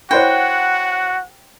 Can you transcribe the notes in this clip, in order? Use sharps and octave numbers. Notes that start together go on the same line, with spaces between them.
E4 F#4 C5 C#5 F#5 G5